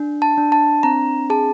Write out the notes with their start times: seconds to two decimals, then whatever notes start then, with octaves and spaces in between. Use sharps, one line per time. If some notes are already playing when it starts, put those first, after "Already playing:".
Already playing: D4
0.22 A5
0.38 D4
0.52 A5
0.83 C4 A#5
1.30 G#4 A5